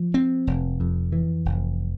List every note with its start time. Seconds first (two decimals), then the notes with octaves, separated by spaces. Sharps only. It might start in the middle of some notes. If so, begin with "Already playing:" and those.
Already playing: F3
0.14 C4
0.47 F1
0.80 F2
1.12 E3
1.45 F1